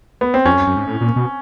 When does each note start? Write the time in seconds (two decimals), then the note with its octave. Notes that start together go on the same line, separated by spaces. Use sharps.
0.21 B3
0.34 C4
0.45 F2 C#4
0.55 F#2
0.67 F#2
0.76 G#2
0.87 A2
1.01 A#2
1.16 B2